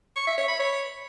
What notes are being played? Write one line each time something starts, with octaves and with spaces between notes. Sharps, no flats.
C#6
E5
C#5
B5
C#5